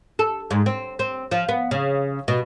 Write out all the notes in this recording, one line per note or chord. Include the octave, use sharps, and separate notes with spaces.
A4
G#2
C4
C4
F3
B3
C#3
B2